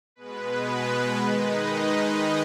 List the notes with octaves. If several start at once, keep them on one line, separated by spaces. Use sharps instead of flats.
B2 G#3 B3 B4
D#3 G#3 D#4 B4 D#5